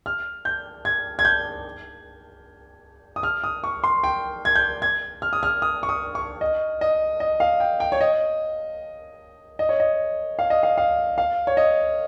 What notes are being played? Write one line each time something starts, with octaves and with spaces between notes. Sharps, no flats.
F6
G6
G#6
G#6
G6
D#6
F6
D#6
C#6
C6
G5
G#6
G6
G#6
F6
D#6
F6
D#6
C#6
D#6
C#6
D#5
D#5
D#5
F5
G5
G5
C#5
D#5
D#5
C#5
D#5
F5
D#5
F5
F5
F5
C#5
D#5